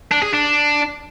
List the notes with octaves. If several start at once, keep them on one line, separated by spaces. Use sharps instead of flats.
D4
G#4
D4